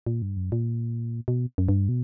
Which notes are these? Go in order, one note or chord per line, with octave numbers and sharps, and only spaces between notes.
A#2
G2
F#2
A#2
B2
F#2
G2
B2